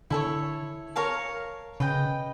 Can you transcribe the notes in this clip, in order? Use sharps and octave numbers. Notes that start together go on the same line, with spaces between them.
D3 E4 A4 C#5
A#4 C#5 F5 A5
C#3 B4 D#5 G5